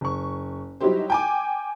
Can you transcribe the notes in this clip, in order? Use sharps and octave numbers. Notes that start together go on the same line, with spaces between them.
F#1 C#6
F#3 G3 D#4 E4 G4 C5
G5 G#5 D6